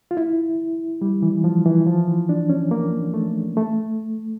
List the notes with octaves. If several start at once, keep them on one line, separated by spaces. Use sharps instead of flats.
F4
E4
G3
E3
F3
E3
F3
E3
D4
C#4
A#3
A3
A3